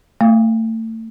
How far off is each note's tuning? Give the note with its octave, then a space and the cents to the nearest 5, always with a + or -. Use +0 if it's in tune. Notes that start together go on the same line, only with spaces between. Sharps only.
A3 +30 F5 +0